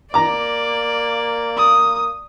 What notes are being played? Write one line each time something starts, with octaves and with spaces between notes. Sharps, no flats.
A#3 D5 A#5 D6
D#6